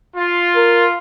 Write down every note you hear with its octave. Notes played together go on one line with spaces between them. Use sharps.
F4
A#4